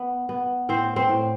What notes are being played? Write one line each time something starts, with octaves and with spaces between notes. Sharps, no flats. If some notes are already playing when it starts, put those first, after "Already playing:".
Already playing: B3
B3
A2 C4 C5
C4 C5
A2